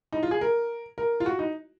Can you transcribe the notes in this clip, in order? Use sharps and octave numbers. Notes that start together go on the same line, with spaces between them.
D#4
F4
G#4
A#4
A#4
F4
F#4
D#4